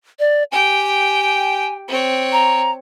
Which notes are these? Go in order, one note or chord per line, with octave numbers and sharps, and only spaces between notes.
D5
G4 G5 G#5
C4 C#5
A#5